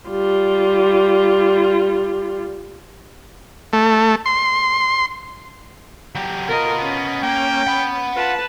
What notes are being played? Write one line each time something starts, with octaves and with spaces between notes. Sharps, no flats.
G3 F4
A3
C6
F#3 G4
B3 F4 A#4 D#5
C#4
A#3 G5
F#5 B5
F4 B4 A5